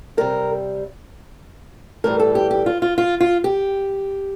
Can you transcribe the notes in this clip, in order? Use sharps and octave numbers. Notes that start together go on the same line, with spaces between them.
C3 G3 A#4
A2 E3 G3 A#4
A4
G4
G4
F4
F4
F4
F4
G4